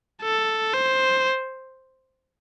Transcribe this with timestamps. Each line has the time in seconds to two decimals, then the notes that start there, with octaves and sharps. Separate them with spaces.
0.22 A4
0.74 C5